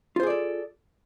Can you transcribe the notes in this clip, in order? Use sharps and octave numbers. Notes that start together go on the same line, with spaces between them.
F4 G#4 A4 C5 D5